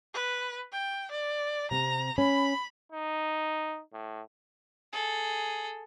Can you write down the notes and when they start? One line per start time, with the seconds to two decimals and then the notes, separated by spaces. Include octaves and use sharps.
0.14 B4
0.72 G5
1.11 D5
1.71 C3 C4 A#5
2.18 C#4 B5
2.92 D#4
3.93 A2
4.93 G#4 A4